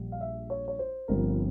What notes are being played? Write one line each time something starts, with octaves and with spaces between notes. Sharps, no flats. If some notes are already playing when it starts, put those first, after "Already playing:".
Already playing: A#1 A#2 G3
F5
E5
C#5
C#5
C5
G1 G2 F3 C4 A#4